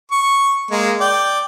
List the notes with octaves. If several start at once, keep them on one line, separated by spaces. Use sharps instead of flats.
C#6
G#3 A#3
D5 G5